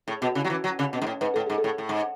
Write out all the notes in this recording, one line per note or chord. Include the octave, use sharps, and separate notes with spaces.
A2 G#4
B2 F#4
C#3 E4
F#3
E3 F#4
F#3
C#3
B2
G#2
A2
G#2 B4
A2 A4
G#2 G#4
A4
A2
A2
G#2